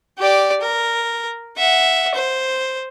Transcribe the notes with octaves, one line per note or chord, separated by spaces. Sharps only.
G4 D5
A#4
E5 F#5
C5